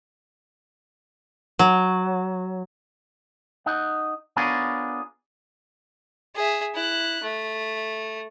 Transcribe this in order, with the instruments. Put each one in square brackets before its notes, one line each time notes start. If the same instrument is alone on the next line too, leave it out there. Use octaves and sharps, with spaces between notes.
[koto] F#3
[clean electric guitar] D#4 F#5
B3 D4 F4 G#4 A#4 C#5
[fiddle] G#4 E5
E4 F#6
A3